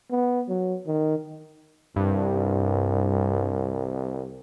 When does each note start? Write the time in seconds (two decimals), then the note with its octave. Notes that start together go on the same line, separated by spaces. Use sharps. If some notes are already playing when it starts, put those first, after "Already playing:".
0.11 B3
0.49 F#3
0.87 D#3
1.96 C2 G2